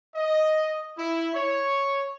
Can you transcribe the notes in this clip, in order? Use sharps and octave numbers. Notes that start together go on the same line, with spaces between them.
D#5
E4
C#5